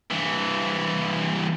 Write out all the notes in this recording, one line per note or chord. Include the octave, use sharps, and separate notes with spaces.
G2 E3